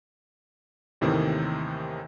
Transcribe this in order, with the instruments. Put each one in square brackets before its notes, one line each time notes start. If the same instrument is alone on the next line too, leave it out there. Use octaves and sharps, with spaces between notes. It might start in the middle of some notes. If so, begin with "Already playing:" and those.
[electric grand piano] D#2 A2 C3 D#3 E3 C4